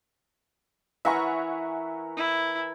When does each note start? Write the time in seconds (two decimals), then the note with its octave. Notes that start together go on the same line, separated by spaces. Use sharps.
1.05 E3 A#4 E5 F#5 G#5 C#6
2.17 E4